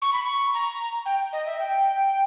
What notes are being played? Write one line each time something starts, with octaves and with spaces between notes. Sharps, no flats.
C#6
B5
C#6
A#5
G5
D#5
E5
G5